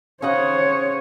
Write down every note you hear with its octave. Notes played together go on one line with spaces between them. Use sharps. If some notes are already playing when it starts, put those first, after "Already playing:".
C#3 C5 C#5 D#5 F#5